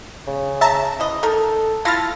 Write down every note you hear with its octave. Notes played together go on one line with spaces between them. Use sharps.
C#3
E5 A5 A#5
E3 D#5
D#4 A4 A#4
E4 F4 A4 F6 A6 A#6